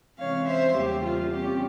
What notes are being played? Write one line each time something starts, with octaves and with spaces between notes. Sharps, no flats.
C3 E3 G#3 C#4 C#5 F5
C5 E5
E2 C#3 G3 A#3 G4
F4
C3 G3 C#4 G4